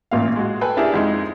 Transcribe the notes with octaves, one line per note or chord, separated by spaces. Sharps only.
A1 A#2 F5
G#3 F#4
A4 B4 G5 G#5
D4 E4 G4 G#4 A#4 E5
F2 G#3 D#4